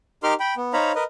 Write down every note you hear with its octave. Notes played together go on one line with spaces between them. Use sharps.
D#4 G4 A#4 C6 D6 F6
G5 B5
B3
D#4 C5 C#5 F5 A#5 B5
A#4 B4 D#5